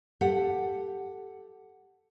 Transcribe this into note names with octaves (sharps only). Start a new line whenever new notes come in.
G4 A4 F#5